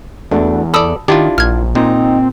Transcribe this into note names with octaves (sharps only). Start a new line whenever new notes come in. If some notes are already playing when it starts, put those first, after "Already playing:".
E2 A3 D4 F#4
A4 D5 A5 B5 D#6 E6
D#3 D4 E4 F4 G4
A#1 F6 G#6
A#2 C4 D#4